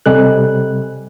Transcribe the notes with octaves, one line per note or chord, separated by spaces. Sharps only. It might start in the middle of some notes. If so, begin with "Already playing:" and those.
C3 G3 A4 D#5 G#5 F#6